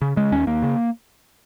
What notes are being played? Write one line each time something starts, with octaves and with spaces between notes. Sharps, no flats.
C#3
C#3 G#3
D#2 C#4
D#2 A#3
C#3